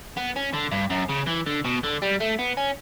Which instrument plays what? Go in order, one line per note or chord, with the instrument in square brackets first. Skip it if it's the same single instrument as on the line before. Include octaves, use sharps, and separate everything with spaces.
[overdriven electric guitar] B3
C#4
D3
G2
F#2
C#3
E3
D3
B2
D3
G3
A3
B3
C#4